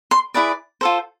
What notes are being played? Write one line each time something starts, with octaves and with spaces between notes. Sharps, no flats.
C6
E4 G#4 B4 D5
F4 A4 C5